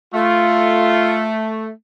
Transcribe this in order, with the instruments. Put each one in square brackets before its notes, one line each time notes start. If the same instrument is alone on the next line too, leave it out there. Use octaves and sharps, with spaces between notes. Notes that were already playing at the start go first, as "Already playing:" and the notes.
[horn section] A3 [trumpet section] F4